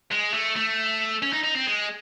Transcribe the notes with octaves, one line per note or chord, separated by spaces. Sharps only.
G#3
A3
A3
C#4
D#4
D#4
C4
G#3